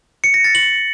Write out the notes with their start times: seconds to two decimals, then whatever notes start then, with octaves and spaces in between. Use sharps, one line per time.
0.24 C#7
0.34 A#6
0.44 A6
0.55 F#7